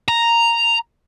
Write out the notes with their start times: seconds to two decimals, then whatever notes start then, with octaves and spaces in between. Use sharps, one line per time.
0.08 A#5